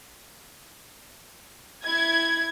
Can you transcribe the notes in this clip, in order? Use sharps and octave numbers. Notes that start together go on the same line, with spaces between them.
E4 G#6